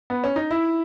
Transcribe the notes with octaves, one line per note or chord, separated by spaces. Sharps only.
B3
C#4
D#4
E4